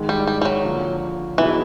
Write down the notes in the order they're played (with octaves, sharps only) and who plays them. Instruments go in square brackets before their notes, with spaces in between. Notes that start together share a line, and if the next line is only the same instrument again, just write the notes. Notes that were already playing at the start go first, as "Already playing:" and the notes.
Already playing: [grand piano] G#2 D#3 G#3
[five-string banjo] G3
G3
G3
F#3
[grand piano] D3 F3 A#3
[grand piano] B2 F#3 B3 D#4 G#4 [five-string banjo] E3